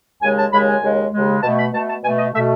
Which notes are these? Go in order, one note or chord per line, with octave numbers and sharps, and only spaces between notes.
D#2 C#3 G#3 G#5
A5
D#2 C#3 G#3 B5
G#5
D#2 C#3 G#3
D#2 C#3 G#3
B2 A3 A5
B5
B2 A3 A5
A5
B2 A3 G#5
D#5
B2 A3 E5